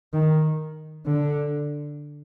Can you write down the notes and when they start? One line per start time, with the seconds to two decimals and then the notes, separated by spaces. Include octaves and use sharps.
0.13 D#3
1.06 D3